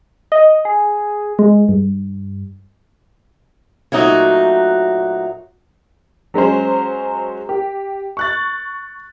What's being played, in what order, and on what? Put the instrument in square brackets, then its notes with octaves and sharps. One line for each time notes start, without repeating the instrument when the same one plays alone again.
[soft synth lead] D#5
G#4
G#3
G2
[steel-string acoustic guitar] A#2 F#3 A3 D#4 F#4
[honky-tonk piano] F#3 G#3 C#4 C5
G4
C#6 F#6 A6